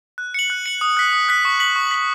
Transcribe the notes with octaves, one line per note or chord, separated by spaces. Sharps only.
F#6
C#7 F#7
F#6
C#7 F#7
D#6
F#6 B6
D#6
F#6 B6
C#6
B6 F#7
C#6
B6 F#7